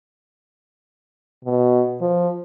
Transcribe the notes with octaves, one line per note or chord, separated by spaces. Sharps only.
B2
F3